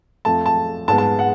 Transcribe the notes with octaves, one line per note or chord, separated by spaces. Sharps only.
F2 F3 A3 A5
A5
G#2 G#3 B3 A5
A5
F#5